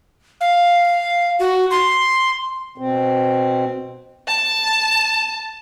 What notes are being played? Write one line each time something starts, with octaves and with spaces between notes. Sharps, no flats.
F5
F#4
C6
B2 C4
A5